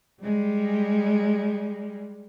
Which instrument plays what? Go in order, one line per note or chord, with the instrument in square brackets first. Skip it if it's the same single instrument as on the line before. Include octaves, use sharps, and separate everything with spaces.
[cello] G3 G#3